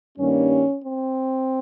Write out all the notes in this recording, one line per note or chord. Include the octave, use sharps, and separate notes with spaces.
G2 D#3 G3 A#3 C#4
C4